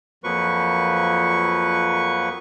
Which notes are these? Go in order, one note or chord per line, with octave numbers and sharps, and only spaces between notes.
F2 F3 F#3 A#3 B4 C#6